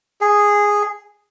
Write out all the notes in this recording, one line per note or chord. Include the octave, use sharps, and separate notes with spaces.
G#4